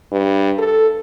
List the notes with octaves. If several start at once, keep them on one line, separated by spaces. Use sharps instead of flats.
G2
A4